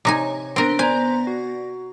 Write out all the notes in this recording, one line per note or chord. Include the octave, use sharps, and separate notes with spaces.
C3 D#4 C#5 G#5
B3 C4 D4 A#4 C5 D7
B3 C5 D5 G#5 A#5 A#6
F#4